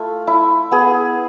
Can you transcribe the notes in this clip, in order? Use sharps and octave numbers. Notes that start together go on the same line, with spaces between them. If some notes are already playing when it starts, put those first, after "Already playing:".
Already playing: A3 E4 F4
E4
B3 G#4